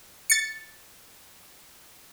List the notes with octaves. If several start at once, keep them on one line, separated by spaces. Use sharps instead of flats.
A6 C#7